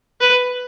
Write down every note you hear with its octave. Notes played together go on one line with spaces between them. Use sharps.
B4